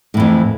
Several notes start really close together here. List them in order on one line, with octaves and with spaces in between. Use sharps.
A2 E3 F2